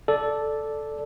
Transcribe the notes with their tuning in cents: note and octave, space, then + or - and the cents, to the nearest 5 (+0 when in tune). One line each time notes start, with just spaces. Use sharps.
A4 -5 D5 +0